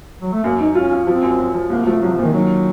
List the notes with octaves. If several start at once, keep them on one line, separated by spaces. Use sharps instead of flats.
F#3
A3
F#2 A#3
F#2 D#4
C#4 F4
F4
F3 C4
F#2
F#2
F3
C2 A#3
F3 A3
C2 F#3
F3
A#2 D#3
D#3 F#3